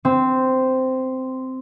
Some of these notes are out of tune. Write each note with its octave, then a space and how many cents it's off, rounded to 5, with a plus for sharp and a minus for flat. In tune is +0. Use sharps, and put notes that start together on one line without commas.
C4 -10